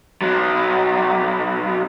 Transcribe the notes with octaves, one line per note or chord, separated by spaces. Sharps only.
B1 F#3